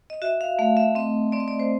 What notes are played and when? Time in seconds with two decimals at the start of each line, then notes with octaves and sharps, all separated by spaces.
0.10 D#5
0.22 F#4 E5
0.41 F5
0.59 A3 F5
0.77 E5
0.95 C4 D#5
1.32 C4 D5
1.40 D#5
1.48 D5
1.59 C5